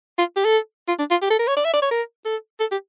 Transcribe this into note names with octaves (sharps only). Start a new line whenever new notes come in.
F4
G4
A4
F4
D4
F4
G4
A4
A#4
C#5
D5
E5
D5
C#5
A#4
A4
A4
G4